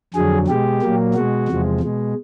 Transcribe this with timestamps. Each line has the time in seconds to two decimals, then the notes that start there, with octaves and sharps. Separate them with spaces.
0.14 F2 D3 F#3 G#4
0.48 B2 G#3 G4
0.82 A#2 F#3 A#3
1.14 B2 G#3 F#4
1.48 E2 C3 F3 G#3
1.80 B2 G#3